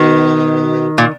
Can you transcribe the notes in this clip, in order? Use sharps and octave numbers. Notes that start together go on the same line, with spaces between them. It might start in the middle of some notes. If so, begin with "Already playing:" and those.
Already playing: B2 D#3
A#2